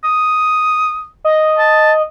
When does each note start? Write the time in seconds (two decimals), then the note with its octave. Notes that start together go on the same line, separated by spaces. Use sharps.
0.04 D#6
1.25 D#5
1.59 A5